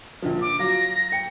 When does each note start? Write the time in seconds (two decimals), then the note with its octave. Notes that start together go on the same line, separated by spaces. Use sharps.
0.22 A#1 D3 F3
0.41 D6
0.59 F#3 F4 A#6
1.12 G5 C#7